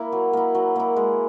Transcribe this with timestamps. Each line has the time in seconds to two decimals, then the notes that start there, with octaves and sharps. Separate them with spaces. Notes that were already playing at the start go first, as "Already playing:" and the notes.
Already playing: A#3 E4
0.12 F#3
0.33 A#3 E4
0.55 F#3
0.76 A#3 E4
0.96 G#3